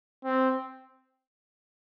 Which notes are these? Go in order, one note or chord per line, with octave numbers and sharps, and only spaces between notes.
C4